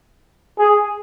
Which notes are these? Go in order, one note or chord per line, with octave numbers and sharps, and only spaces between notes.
G#4